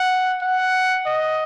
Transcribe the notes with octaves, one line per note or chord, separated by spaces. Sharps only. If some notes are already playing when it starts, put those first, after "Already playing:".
Already playing: F#5
F#5
D#5